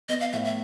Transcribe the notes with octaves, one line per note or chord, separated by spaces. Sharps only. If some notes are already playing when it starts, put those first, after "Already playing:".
B3 D#5
F5
A2 E5
E5